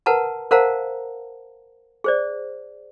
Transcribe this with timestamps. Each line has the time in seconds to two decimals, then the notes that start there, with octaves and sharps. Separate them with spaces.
0.06 A#4 B4 F#5 A5 A#5
0.51 A#4 C5 F5 F#5 A5 A#5
2.04 G#4 C5 D5